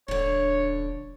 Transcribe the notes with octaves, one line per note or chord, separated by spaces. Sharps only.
D#1 D3 D4 C#5